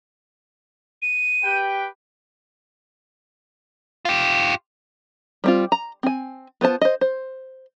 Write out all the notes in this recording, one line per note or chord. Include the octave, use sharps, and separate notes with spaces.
D#7
G4 B4 G5
F4 G4
G3 C4 F4
A#5
C4 G#5
B3 F4 C5 A5
C5 D#5
C5